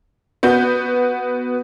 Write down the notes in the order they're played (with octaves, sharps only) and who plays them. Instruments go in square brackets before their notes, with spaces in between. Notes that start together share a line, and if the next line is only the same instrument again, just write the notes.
[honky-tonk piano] B3 F#4 G6